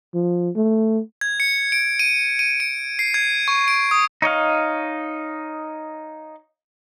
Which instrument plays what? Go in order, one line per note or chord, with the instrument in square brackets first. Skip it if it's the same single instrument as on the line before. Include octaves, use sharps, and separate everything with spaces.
[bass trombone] F3
A3
[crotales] G#6
C#7
D7
D#7
D#7
D7
C7
G#6
C#6
D7
D#6
[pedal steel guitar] D#4 C#5 D#5 F5